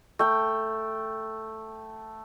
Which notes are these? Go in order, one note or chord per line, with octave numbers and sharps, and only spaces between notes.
A3 G5